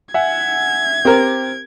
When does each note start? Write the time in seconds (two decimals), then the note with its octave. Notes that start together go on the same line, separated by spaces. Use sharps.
0.14 E5 F#5 G#5 G#6
1.05 C4 G4 A#4